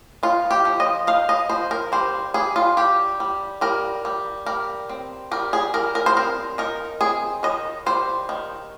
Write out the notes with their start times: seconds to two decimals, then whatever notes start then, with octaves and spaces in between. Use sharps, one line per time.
0.23 D#4 F4
0.51 G4
0.65 F3
0.80 D#5
1.07 D#4 F5
1.29 D#5
1.49 F3 C5
1.71 A#4
1.92 G3 C5
2.34 G3 G#4
2.56 F4
2.77 G3 G4
3.20 G3
3.61 G3 A#4
4.05 G3
4.46 G3 A#4
4.89 C4
5.31 G3 A#4
5.53 G#4
5.74 G3 A#4
5.95 A#4
6.06 C5
6.17 C4 A#4
6.58 D#4 A#4
7.01 C4 G#4
7.43 D#3 D#5
7.86 G3 C5
8.29 D#3